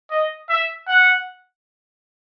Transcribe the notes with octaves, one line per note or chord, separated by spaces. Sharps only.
D#5
E5
F#5